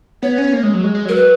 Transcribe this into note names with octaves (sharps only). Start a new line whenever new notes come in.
B3 C#5
C#4
A#3
G#3
F#3
G#3
G#3
F#3 A#4
B4